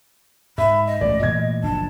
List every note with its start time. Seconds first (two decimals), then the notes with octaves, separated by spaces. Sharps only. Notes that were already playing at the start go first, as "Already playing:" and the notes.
0.58 G#2 E5 B5
0.87 D#5
1.01 A1 G#2 A3 D5
1.23 A#2 E3 A3 G#6
1.63 F#1 F3 D4 A5